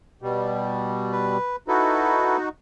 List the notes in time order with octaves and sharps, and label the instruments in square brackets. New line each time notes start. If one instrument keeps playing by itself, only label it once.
[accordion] B2 G3
[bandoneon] B4
[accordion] D#4 F#4 [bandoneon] E4 A4 B4